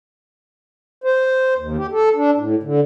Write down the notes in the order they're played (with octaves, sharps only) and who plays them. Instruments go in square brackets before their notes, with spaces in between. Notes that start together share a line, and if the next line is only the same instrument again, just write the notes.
[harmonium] C5
D#2
G4
A4
D4
A2
D3